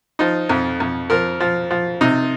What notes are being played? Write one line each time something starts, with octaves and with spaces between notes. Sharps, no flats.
F3 D#4
F2
F2
F3 A#4
F3
F3
C3 D#4